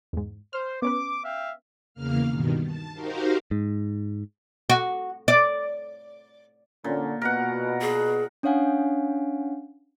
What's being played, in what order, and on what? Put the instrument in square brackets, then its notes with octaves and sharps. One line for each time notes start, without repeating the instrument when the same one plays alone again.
[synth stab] E2 G#2
[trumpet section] C5 [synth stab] F6
[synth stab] B3 C#4 B4 [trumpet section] D6
[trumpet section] E5 F5 G5
[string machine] E2 C#3 A#3 F5 F6
G2 B2 D#3
A5
D#4 F#4 G4 A#4 C5 F5
[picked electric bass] G#2
[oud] F#4
D5
[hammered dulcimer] A#2 [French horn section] D3 C#4
[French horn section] B2 [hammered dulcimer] A#4 F#5
[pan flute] G#4
[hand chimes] C#4 D4 C#5 F5 F#5 G#5